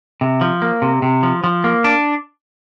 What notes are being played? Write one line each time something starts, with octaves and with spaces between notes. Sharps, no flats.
C3
F3
A#3
C3
C3
F3
F3
A#3
D4